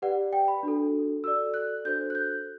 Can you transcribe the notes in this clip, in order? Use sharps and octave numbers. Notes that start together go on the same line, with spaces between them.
G4 B4 D5 F#5
G5
B5
D4 F#4 A4
F#4 A4 D5 E6
F#6
D4 F#4 A4 C5 G6
F#6
G6